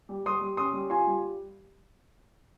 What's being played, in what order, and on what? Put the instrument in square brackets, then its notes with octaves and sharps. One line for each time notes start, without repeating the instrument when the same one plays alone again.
[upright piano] G3
G3 C6 D#6
G3
C#4 C6 D#6
G3
F4 G#5 C6
G3